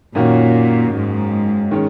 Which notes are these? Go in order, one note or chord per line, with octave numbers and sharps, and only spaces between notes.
F#2 A#2 D#3 A#3 C#4 F#4
G#2
D#3 G#3 C#4